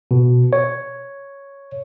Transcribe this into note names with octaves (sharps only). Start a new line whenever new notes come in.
B2
C#5